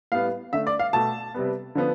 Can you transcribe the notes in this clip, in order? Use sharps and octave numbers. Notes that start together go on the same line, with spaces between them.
A2 G3 B3 F5
D3 A3 E5
D5
F5
B2 A3 A5
C3 G3 B3
D3 F3 B3